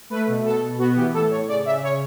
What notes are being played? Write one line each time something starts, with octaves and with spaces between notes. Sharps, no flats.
A3 B4
B2
B2 A4
B2
B3 F#4
E3 G4
A2 A4
A2 C#5
C#3 D5
C#3 E5
C#3 C#5